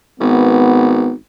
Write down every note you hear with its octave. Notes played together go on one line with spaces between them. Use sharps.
G#1 B3